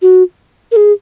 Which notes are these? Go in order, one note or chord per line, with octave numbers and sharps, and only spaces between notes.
F#4
A#4
G#4